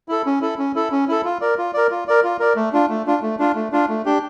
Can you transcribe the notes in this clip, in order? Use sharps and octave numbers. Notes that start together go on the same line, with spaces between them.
E4 A4
C#4
E4 A4
C#4
E4 A4
C#4
E4 A4
F4
A#4 D5
F4
A#4 D5
F4
A#4 D5
F4
A#4 D5
A3
D4 F4
A3
D4 F4
A3
D4 F4
A3
D4 F4
A3
D4 G4